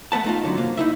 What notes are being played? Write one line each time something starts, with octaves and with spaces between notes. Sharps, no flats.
A3 B3 B4 A5
A3 D#4 F4
F#2 D3 F#3
C2 A#3
D#4 E4 E5